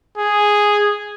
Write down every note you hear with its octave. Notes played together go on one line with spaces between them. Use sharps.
G#4